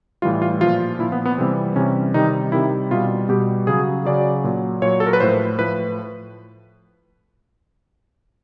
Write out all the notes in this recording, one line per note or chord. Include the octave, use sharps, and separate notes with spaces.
A2 E3 G3 F4
F4
A#2 F3 F4
A#2 F3 E4
B3
B3
C3 E3 G3 C4
C3 E3 G3 C#4
C3 D#3 G3 D#4
C3 D#3 G3 E4
B2 G3 F4
B2 G3 G4
C#3 F#3 G#4
C#3 F#3 D5
A#2 F#3
A#2 F#3 C#5
A4
A#4
B4
A2 F3 C5
A2 F3 B4